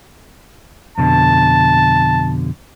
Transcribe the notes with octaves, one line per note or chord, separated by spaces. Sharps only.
F2 B2 D3 A5